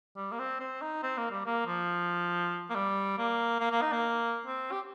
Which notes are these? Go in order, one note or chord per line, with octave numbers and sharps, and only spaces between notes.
G3
A#3
C4
C4
D#4
C4
A#3
G3
A#3
F3
A#3
G3
A#3
A#3
A#3
D#4
A#3
C4
G4